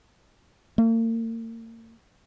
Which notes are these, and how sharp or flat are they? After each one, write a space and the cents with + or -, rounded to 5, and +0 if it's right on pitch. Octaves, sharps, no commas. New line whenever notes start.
A#3 -40